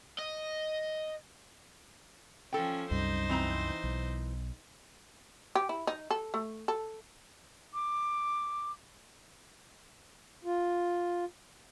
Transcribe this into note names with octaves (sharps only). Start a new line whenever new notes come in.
D#5
F3 C#4 A4 G5
C2 F#2 G3 D#4 C5
E3 C4 A#5
B1
G4
E4
D#4
A4
A3
A4
D6
F4